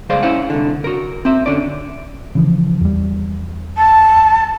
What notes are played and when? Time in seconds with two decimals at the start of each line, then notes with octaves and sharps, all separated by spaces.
0.09 C#2 G3 G#4 C5 D5 F5
0.23 C#4 E4 C5 F#5
0.50 C2 D3
0.84 F#4 A#4
1.25 C4 E5
1.46 D3 C#4 D5
2.35 C#3 E3 F3
2.81 E2 G3
3.77 A5